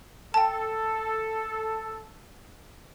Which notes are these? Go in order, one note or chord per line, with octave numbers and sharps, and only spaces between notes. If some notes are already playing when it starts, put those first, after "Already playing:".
A4 G5 A5